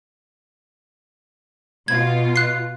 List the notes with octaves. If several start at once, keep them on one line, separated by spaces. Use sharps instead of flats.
B2 F4 G#6
F#6 C7